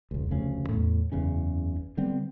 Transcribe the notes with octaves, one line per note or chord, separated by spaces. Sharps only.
E1 C#2
F1 D2 C#3 C#4
E2 A2
F#1 E2 C#3 C#4
D3 G3 B3 C4